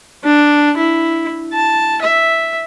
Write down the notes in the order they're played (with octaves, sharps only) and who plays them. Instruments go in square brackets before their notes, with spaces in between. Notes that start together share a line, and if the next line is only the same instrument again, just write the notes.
[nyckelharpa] D4
E4
A5
E5